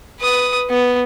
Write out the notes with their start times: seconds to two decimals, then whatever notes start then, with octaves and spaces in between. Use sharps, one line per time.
0.20 B4 D#6
0.70 B3